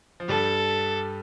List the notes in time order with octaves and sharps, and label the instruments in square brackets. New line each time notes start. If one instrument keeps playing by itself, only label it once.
[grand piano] F3
[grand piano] G2 G3 [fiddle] A4